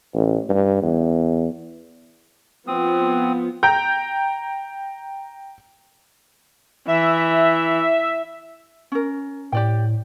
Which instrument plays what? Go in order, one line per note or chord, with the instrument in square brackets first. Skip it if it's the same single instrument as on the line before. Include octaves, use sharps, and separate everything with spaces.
[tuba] A1
G2
E2
[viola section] F3 B3 [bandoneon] C4 D#6
[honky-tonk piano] G5 A#5 G6
[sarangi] E3 [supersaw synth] E5
[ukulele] C#4 A#4
[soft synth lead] A2 [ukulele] G4 D5 G5